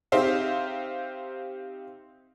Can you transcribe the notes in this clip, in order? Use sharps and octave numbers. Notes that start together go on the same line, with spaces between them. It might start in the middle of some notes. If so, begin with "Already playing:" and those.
C4 D#4 G4 C5 E5 F5